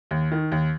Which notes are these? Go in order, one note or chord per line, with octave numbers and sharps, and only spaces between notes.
D#2
D#3
D#2